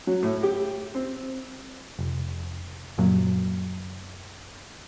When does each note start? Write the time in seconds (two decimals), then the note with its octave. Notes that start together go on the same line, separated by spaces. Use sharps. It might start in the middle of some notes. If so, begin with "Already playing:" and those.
0.07 F#3
0.23 A2
0.43 G4
0.95 C4
1.99 F1
2.98 F#1 F#2 A#2 F#3